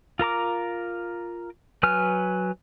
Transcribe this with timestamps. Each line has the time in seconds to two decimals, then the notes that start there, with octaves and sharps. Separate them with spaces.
0.19 F4 A#4 A#5 D6
1.83 F#3 B4 G#5 F6